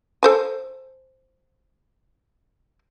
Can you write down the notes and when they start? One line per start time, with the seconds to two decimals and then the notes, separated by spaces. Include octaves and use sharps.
0.23 A4 C5 G#5